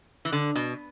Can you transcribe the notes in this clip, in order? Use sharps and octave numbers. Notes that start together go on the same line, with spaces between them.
E3
D3
B2